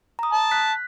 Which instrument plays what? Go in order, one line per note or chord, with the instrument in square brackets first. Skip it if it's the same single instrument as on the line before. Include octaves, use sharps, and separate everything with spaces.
[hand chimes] A#5 D#6
[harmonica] A5
[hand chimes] F#6 B6